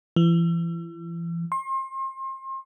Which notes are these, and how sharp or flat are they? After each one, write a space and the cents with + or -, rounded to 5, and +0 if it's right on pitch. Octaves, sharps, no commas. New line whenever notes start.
E3 +35
C6 +35